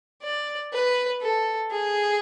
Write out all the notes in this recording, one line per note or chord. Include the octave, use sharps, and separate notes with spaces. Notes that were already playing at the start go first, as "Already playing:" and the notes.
D5
B4
A4
G#4